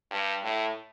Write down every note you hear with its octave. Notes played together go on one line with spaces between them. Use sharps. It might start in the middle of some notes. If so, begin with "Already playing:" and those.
G2
A2